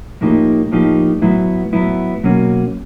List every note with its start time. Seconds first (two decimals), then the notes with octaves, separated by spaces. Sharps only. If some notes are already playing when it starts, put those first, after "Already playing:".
0.21 A2 F3 A#3 D#4 G4
0.72 A2 F3 A#3 D#4 G4
1.21 A2 F#3 B3 E4
1.73 A2 F#3 B3 E4
2.23 B2 F#3 A#3 C#4 F#4